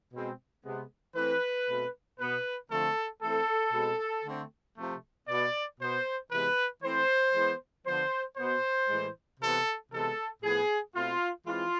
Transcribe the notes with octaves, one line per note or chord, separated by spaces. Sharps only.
B2 G#3 C4
C3 G#3 B3
E3 A3 C4 B4
B2 A3 C4
B2 B3 B4
D3 F3 A3 C4 A4
E3 A3 C4 A4
B2 G#3 C4
D3 A3 C4
C3 F3 A3
B2 B3 D5
B2 B3 C5
C3 E3 G#3 B3 B4
E3 A3 C4 C5
E3 G#3 B3
D3 F3 B3 C5
B2 B3 C5
A2 E3 G#3
C3 E3 B3 A4
C3 E3 G#3 B3 A4
A2 F3 B3 G#4
B2 A3 C4 F4
E3 G#3 C4 F4